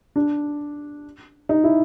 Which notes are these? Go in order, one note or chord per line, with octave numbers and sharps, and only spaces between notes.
D4
D#4
E4